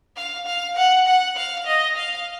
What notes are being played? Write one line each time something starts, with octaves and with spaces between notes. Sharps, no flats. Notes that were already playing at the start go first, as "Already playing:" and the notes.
F5
F5
F#5
F#5
F5
D#5
F5